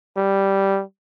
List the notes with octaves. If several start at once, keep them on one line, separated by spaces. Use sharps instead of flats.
G3